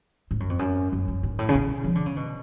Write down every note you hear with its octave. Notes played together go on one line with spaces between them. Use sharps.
G#2
F#2
F2
F#2
F#2
F#2
G#2
A2
C#3
B2
F3
D3
C#3
B2